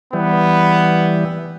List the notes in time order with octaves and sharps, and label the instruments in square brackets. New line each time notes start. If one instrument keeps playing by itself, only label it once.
[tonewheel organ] E3 G3 [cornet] B3